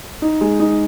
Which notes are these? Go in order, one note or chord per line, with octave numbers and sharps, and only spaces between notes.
D#4
G#3
D#4